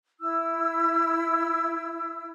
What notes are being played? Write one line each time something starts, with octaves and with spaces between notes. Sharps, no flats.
E4 E6